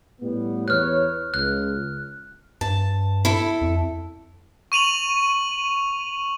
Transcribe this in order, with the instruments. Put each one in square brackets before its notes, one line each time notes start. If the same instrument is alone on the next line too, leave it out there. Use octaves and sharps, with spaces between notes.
[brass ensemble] A2 G3 B3
[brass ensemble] E2 B4 C#5 [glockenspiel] F6 F#6
[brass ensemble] C#2 [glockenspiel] F#6
[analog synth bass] G2 [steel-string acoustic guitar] A5
[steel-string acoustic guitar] E4 A4
[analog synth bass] F2
[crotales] C#6 D#7 F7 F#7